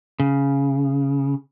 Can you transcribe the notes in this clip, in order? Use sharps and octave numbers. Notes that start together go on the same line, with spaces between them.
C#3